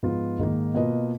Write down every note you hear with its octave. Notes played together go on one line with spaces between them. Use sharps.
G#2 F3 B3 F4
G#2 D#3 A#3
B2 A#3 F4 B4 D#5